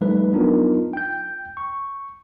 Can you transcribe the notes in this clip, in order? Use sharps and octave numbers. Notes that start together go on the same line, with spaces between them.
F3 G3 A3 D#4 A4 B4
F#3 B3 D4 D#4 F4 A#4
G5 G6
C#6